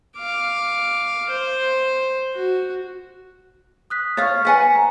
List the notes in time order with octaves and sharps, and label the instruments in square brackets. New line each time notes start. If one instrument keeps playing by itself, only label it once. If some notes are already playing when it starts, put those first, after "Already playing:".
[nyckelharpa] F5 D6
C5
F#4
[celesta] D#6 F#6 B6
[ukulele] C#5 F5 [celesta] C#6 F6 A6
[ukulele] B4 F#5 G#5 [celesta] B6
[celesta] A#5